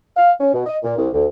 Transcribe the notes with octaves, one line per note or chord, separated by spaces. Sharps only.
F5
C#4
B2
D#5
A#2
C2
D2